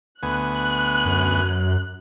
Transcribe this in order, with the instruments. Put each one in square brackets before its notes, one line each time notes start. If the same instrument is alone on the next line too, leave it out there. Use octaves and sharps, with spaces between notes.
[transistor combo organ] D2 B3 G#5 [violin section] F#6
[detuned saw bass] F#2